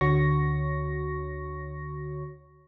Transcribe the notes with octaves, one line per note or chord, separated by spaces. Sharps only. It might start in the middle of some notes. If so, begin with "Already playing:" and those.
D2 D3 F#4 C#5 C#6 A#6